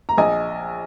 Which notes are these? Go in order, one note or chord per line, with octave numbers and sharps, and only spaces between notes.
A#5
A#1 D#5 G#5